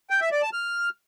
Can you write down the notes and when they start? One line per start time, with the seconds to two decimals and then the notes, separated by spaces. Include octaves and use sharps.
0.10 G5
0.21 E5
0.32 D5
0.42 A5
0.53 F6